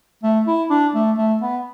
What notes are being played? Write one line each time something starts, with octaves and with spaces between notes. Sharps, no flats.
A3
E4
D4
A3
A3
B3